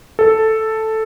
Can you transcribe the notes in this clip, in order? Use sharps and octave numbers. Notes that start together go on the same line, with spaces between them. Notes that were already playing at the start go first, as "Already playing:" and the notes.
A4